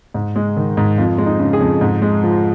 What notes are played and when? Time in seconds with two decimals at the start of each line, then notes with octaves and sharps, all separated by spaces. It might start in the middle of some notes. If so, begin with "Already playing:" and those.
0.14 G#2
0.36 G#3
0.56 D#3
0.77 G#2
0.98 F2 F4
1.18 G#3
1.26 D#4
1.40 C#3
1.53 G#4
1.61 F2
1.81 G#2
2.02 G#3
2.23 F3